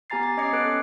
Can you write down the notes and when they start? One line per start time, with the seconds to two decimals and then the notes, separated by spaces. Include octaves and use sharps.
0.10 B3 G4 G#5 A#5 A6 C7
0.23 A6
0.37 C#4 D#5 D6 G#6 C7 C#7
0.53 B3 A4 B4 F#6 D7
0.65 C#4